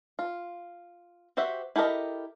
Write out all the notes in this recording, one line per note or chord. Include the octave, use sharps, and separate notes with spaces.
F4
F#4 G4 C5 E5 F#5
E4 G4 A4 A#4 D#5